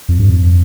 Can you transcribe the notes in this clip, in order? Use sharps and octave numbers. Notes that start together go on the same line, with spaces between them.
F2
G2
F2